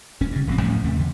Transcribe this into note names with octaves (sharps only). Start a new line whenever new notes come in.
D#1 C#4
G2 C#3
D1 A1 F#3 C4
D#2 A2 F3 C#4
D#2 C3 A3
E2 D3